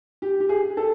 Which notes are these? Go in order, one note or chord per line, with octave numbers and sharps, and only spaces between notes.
G4
G4
G#4
A4